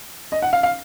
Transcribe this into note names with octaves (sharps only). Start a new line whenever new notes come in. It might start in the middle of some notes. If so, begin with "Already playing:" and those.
D#5
F#5
F5
F5